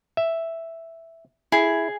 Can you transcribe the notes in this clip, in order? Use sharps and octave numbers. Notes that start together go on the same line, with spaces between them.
E5
E4 G#4